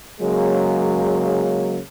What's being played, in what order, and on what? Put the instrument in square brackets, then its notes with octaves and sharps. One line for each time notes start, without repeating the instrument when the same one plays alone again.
[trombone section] C#3 F#3 G#3 A#3